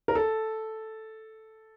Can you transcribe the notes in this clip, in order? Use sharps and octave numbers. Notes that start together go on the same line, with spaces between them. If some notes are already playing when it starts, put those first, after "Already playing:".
A#4
A4